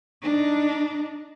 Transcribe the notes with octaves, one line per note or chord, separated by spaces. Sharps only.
D4 D#4